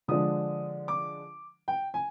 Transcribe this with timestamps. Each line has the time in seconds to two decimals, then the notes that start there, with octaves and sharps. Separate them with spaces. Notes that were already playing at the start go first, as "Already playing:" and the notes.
0.08 D3 F3 G#3 D4 D#6
0.88 D6
1.68 G5
1.94 G#5